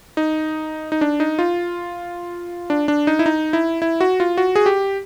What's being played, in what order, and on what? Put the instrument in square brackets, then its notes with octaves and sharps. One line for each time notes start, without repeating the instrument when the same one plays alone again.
[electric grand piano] D#4
D#4
D4
D#4
F4
D4
D4
D#4
E4
D#4
E4
E4
F#4
F4
F#4
G#4
G4